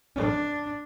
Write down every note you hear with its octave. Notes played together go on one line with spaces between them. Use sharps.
D4